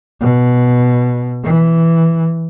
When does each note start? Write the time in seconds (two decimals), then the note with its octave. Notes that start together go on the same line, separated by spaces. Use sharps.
0.21 B2
1.43 E3